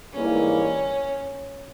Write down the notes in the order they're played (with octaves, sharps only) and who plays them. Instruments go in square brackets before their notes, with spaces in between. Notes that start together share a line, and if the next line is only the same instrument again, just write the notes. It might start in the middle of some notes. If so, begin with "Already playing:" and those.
[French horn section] G#2 E3 G3 A#3 E4 [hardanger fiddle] C#4